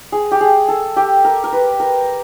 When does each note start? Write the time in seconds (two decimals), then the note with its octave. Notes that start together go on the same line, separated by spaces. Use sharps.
0.12 G#4
0.31 G4
0.41 G#4
0.68 A4
0.96 G4
1.25 A#4
1.44 A#4
1.53 B4
1.80 A#4